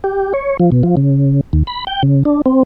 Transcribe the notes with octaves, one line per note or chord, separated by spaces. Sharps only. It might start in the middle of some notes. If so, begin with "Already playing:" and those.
G4
C#5
F3
B2
F3
C#3
D#2
B5
G5
C#3
D4
C4